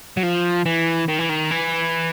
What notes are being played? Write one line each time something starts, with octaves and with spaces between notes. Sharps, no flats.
F#3
F3
E3
D#3
E3
D#3
E3